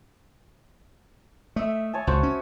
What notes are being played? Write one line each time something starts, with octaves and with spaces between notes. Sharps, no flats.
A3 D#5 E5
C#5 G#5 A5
C#2 F#4 C5 C#6
C#4